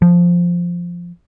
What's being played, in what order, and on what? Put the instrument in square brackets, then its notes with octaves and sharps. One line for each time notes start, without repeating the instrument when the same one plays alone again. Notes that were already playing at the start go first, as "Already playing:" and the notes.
[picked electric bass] F3